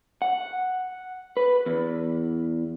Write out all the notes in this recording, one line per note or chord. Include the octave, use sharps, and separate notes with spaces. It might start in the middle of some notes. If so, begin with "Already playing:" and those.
F#5
B4
E2